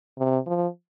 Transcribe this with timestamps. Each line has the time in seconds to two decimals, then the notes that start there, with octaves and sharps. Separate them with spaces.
0.18 C3
0.46 F3